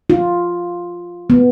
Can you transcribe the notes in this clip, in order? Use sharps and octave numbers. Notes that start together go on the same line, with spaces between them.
F4
B3